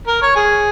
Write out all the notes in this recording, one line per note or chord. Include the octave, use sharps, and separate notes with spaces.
A#4
C#5
G#4